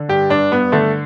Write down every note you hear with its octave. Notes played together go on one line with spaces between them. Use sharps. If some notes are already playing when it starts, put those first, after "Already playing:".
Already playing: D3
G2 G4
G2 D4
G2 B3
D3 A3